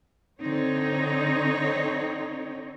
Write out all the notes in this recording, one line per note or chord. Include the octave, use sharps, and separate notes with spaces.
D3 C4 D#4 C#5